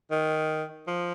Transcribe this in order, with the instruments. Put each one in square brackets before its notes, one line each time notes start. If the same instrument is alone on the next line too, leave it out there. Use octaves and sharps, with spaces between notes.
[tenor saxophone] D#3
F3